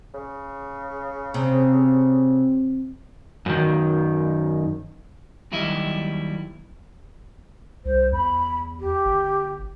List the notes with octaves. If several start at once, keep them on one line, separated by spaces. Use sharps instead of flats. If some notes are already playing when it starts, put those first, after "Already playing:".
C#3
C3
F#2 D#3
D#2 F#3 G3 E4 D#5 E5
C2 C5
E2 B5
G4
G1